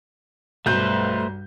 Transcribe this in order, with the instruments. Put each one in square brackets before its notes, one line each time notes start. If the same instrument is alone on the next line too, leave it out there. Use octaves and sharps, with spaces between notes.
[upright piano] B1 G6 [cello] G2 G3 [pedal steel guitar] A3 B4 C5